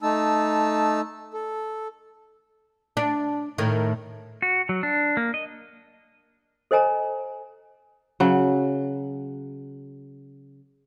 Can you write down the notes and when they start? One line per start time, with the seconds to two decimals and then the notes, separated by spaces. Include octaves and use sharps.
0.02 A3 D#4 A5 E6
1.34 A4
2.97 D4
3.58 A2 D#3
4.42 F#4
4.69 F#3
4.83 D4
5.17 A#3
5.34 D#5
6.71 A4 C5 D#5 G#5 A#5
8.20 C#3 F#3